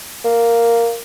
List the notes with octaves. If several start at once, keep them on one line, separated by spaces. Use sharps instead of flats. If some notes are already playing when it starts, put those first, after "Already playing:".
A#3